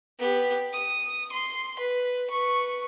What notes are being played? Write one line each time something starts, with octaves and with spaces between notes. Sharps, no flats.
B3 G4
D#6
C6
B4
B4 C#6